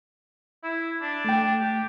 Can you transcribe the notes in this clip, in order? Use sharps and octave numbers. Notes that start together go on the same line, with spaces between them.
E4
D4
A3 G5
G4